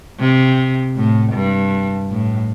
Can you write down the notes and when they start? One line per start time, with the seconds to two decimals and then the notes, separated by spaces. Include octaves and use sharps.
0.19 C3
0.96 A2
1.33 G2
2.10 A2